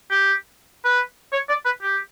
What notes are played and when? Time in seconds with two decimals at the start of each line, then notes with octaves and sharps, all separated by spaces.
0.10 G4
0.85 B4
1.33 C#5
1.49 D5
1.65 B4
1.82 G4